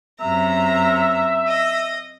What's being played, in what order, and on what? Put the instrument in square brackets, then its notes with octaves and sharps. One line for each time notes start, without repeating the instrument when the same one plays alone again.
[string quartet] F#2 C3 A#5 [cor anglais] E5
[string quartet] D#5